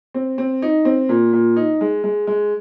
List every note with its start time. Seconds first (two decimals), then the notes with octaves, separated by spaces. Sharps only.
0.14 C4
0.38 C4
0.62 D#4
0.85 C4
1.09 A#2
1.33 A#2
1.56 D#4
1.81 G#3
2.04 G#3
2.27 G#3